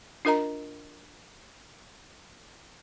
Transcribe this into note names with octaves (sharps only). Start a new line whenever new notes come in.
D4 F4 A#4 D#5 A#5